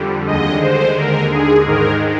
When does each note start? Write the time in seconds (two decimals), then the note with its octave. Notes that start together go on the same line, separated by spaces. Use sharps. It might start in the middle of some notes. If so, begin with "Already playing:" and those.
Already playing: F2 D3 G3
0.27 D#2 D3 G#3 D#5
0.62 C5
0.97 A#4
1.32 G#4
1.66 G#2 D#3 G#3 A#4